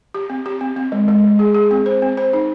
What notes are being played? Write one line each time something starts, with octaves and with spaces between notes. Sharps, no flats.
G4
C4
G4
C4
C4
G#3
G#3
G#3
G#4
G#4
C4
C5
C4
C5
D#4